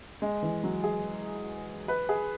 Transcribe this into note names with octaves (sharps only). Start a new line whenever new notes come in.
G#3
E3
F#3
G#4
B4
G#4